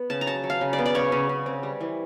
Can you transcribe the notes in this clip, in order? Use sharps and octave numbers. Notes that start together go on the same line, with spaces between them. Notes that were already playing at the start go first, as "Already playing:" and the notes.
Already playing: B3
C#3 A5
A#5
F#3 A5
F#3
F5
C#3
D5
B3
D5
C#3 C#5
C#3
C#3
C4
G3
E3